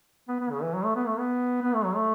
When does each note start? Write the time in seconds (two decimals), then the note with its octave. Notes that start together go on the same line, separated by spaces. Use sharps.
0.29 B3
0.41 B3
0.51 C#3
0.63 E3
0.74 F#3
0.85 A3
0.96 B3
1.07 A3
1.19 B3
1.63 B3
1.75 A3
1.85 F#3
1.96 A3